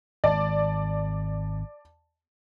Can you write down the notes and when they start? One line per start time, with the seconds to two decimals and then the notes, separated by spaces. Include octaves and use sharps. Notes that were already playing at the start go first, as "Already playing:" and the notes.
0.24 G#1 D5 A5